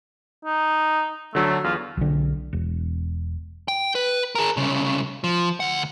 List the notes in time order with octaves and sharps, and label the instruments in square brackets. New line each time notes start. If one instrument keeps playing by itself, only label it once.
[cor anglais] D#4
[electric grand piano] D3 F#3 D4 [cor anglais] A3
[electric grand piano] E2 [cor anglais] F4
[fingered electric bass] B1 D3
E1
[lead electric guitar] G5
B4
G#4 A#4
C2 C#3
F3
D2 F#5